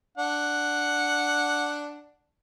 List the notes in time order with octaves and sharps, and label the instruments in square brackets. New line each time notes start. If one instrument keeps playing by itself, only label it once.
[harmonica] D4 F#5